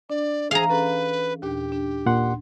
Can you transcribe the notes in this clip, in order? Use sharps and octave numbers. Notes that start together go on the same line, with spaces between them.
D4 D5
E3 G#4 F5 A#5
C#4 G#4 A4 B4
D#2 A#2 D4 G4
D4
A#2 F#5 C6